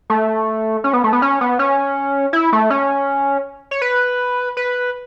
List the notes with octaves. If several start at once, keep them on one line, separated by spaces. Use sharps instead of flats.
A3
C#4
B3
A3
B3
C#4
B3
C#4
E4
A3
C#4
C#5
B4
B4